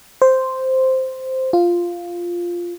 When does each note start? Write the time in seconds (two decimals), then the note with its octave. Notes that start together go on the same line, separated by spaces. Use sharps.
0.22 C5
1.53 F4